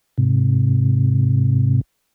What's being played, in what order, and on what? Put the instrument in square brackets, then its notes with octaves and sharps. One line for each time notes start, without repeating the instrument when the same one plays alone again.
[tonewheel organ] G#2 C3